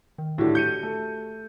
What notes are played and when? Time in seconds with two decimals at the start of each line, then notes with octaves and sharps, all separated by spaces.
0.18 D#3
0.38 A2 D3 F#4 G4
0.55 G6 C#7 D#7
0.83 A3